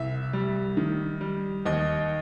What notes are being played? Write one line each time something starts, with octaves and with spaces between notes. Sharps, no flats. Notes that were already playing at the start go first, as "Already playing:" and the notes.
Already playing: C2 E5
G3
D#3
G3
D#2 D#5